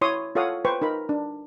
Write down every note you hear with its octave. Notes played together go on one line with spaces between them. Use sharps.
E4 C#5 C6 D#6
F4 A4 C#5 F5 F#5 D#6
B4 C5 G5 C#6
D#4 A#4 B5
D4